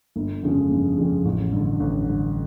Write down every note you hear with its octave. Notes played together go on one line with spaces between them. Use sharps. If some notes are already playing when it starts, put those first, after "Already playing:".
G1
F2 C#3 F3 G#3
G1
F2 C#3 F3 G#3
A1
G2 D3
A1
G2 D3